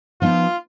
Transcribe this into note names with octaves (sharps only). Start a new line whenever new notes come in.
F3 B3 D#4 F4